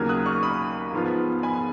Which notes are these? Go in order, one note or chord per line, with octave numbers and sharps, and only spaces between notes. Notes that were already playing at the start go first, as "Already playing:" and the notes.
Already playing: D#2 C#3 F#3 A#3 F6 G#6
D#6 F#6
C#6 F6
B5 D#6
G#2 F3 B3 F4
G#5 B5